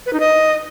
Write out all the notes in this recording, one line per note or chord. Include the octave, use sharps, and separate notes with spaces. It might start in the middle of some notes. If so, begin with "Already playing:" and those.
B4
D#4
D#5